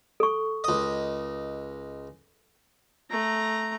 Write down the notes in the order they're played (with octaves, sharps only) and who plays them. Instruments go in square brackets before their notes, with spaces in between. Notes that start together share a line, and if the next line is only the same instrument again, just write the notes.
[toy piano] A4 C#6
[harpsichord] C#2 D#5
[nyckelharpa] A3 A#5